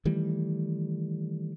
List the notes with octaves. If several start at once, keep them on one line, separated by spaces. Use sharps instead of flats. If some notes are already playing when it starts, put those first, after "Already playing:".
D#3 E3 G3 A3